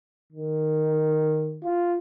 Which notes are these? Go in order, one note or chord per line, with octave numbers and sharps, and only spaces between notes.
D#3
F4